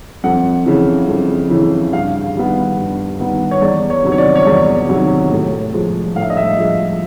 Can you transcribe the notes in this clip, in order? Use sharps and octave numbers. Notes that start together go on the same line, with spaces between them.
F2 F#5
C#3 E3
F2
C#3 E3
G2 F5
D#3 G3 B3
G2
D#3 G3 B3
C#5
E2 D5
C#5
C3 D#3 F#3
C#5
D5
C#5
E2 D5
C3 D#3 F#3
A2
F3 G#3
A2 F5
E5
D#5
E5
F3 G#3